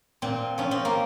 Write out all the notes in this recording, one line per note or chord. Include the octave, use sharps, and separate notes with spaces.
A#2 C4
F3 C#4
C4
A#3